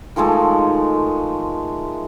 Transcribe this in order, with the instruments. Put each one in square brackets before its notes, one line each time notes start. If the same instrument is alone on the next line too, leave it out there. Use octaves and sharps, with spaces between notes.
[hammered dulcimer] D#3 F3 G#3 A3